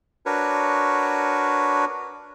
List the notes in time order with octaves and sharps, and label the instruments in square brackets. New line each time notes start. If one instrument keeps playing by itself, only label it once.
[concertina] D4 F#4 A#4 B4 C#5